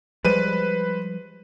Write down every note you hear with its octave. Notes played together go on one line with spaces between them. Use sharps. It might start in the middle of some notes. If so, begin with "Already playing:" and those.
F3 G3 G#3 B4 C5 D#7